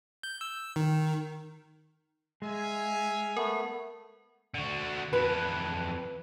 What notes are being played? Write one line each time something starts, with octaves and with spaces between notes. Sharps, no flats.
G6
E6
D#3
G#3 E5 F5 G#5
A3 B3 A#4
D3 F#4
F2 E3 B4